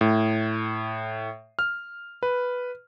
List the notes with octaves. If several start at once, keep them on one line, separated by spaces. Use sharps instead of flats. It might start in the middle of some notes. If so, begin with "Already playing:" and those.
A2
F6
B4